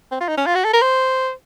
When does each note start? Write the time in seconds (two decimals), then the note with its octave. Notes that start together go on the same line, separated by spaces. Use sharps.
0.11 C4
0.20 F4
0.28 D#4
0.37 C#4
0.46 F4
0.55 F#4
0.64 A4
0.73 A#4
0.82 C5